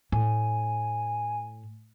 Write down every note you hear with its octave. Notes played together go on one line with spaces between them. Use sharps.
A2 G#5